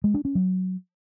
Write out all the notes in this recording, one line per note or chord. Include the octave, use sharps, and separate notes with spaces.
G#3
D4
C#4
F#3